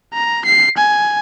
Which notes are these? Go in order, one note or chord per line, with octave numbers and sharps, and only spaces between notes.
A#5
C7
G#5